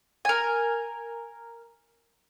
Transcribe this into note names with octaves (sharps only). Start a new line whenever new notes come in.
A#4 G#5